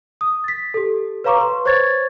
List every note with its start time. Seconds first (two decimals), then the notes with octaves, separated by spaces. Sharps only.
0.21 D#6
0.44 A6 B6
0.74 G4 A4
1.24 B4 C#5 F5 A#5 C#6 D6
1.38 B4 C6
1.65 C5 C#5 C#6 G#6 A6